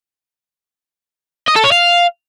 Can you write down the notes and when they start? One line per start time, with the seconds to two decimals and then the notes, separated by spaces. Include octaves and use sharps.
1.48 D#5
1.56 A4
1.64 C#5
1.72 F5